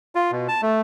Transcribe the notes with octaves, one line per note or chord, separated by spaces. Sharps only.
F4
B2
A5
A3